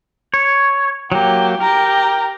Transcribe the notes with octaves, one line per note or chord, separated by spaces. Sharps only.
C#5
F#3 A#3 G4
G4 A#4 A#5